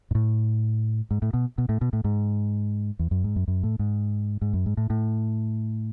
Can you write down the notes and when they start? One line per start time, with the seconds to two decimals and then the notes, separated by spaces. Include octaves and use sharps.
0.11 G#2
0.15 A2
1.11 G#2
1.22 A2
1.34 B2
1.58 B2
1.69 A2
1.81 B2
1.93 A2
2.04 G#2
2.99 E2
3.11 F#2
3.24 G#2
3.36 F#2
3.48 F#2
3.63 A2
3.79 G#2
4.41 G#2
4.53 F#2
4.66 G#2
4.77 A2
4.90 A2